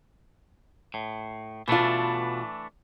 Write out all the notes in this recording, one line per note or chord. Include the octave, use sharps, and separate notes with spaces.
A2
B2 E3 A3 D4 F4